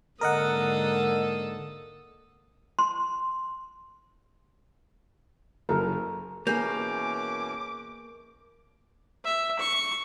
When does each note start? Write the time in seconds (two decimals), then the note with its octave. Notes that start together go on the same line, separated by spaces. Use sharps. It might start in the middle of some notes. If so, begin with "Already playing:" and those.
0.21 G#2 D3 A#3 A4 A#4 D#5 F#5 D#6
2.79 C6
5.69 F#1 F#2 A4 A#4
6.47 B2 E3 A#3 C#4 G#4 D6 G6
9.24 E5
9.59 C#6